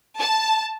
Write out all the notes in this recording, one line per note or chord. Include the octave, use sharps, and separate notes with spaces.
A5